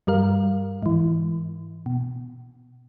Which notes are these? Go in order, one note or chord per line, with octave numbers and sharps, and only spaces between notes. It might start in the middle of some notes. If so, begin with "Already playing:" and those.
G2 G3 A#4 F5
G#2 E3
B2